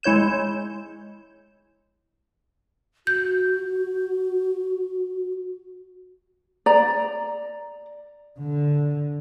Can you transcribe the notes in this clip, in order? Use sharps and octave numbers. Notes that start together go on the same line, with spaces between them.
G#3 E4 C#5 G6 E7
F#4 G6
D5 A#5
D3